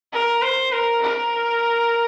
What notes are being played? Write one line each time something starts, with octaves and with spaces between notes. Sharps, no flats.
A#4
C5
A#4
A#4